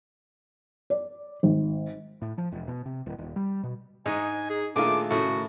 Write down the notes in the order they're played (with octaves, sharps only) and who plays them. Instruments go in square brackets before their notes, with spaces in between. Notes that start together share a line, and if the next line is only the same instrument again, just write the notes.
[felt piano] D5
G#1
[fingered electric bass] A2
F3
E1
B2
C3
D1
D#1
G3
B2
[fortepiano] G#2 G#3 [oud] D#4 [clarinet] G#5
[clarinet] G#4
[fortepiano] A#2 D4 F4 [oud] D#3 A3 G#4 [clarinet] D6
[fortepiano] A2 C#3 [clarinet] F#4